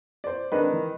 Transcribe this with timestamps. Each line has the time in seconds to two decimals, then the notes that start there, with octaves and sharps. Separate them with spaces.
0.24 C5 D5
0.52 D#3 G#3 C4 D4 B4
0.72 E3 D#4